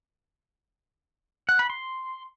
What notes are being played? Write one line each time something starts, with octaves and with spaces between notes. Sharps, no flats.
F#5
B5
C6